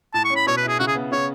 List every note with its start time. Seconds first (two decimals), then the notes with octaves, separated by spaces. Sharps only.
0.14 A2 A5
0.25 C#6
0.30 C#4
0.36 B5
0.47 B2 C#5
0.57 B4
0.63 E4 G#4
0.79 C#3 F#4
0.87 G#4
0.95 B3
1.12 C#3 C#5